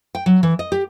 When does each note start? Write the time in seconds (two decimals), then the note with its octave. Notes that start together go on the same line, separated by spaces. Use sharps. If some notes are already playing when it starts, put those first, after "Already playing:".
0.15 G5
0.26 F#3
0.43 E3
0.59 D#5
0.72 G4